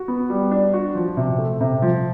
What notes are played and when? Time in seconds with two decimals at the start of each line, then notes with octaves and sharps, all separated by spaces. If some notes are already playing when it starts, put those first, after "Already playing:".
Already playing: F#4
0.08 B3
0.30 G3
0.51 D4
0.74 F#4
0.95 F3
1.17 C3
1.38 A3
1.61 C3
1.82 F3